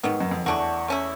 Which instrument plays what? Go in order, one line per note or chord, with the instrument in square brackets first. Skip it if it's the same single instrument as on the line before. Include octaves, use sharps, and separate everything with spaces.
[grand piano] G#2 [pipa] D#3 F#3 B3
[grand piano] F#2
F2
[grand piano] E2 [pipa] F#3 A3 D4 F#4
[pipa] A3 C#4 E4